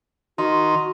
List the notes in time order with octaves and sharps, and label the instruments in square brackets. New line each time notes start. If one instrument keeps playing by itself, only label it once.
[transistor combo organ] D#3 D#4 [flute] F#4 [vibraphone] C6